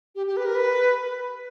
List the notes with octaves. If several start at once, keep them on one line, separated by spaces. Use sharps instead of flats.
G4
G4
B4
A#4
B4